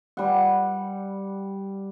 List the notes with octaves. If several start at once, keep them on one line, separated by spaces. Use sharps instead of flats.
G3 F#5